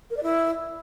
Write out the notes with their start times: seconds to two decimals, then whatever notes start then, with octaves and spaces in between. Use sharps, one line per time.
0.10 A#4
0.17 D5
0.23 E4